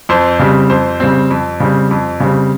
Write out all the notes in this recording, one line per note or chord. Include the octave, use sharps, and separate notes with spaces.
F2 C5
C#3 G3 C4
F2 C5
C#3 G3 C4
F2
C#3 G3 C4
F2
C#3 G3 C4